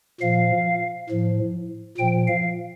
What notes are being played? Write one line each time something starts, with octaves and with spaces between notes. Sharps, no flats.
A#2 F3 F5
A2 F3
A#2 F3 G5
F5